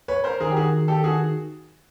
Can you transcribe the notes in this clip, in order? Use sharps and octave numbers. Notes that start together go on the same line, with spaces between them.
B4 C#5
A#4 C5
D#3 G#4 A#4
G4
F#4 G#4
G4 A4
F#4 G#4